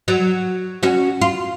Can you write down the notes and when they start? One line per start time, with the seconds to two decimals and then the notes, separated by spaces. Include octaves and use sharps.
0.08 F#3
0.83 C#4 F#4
1.21 F4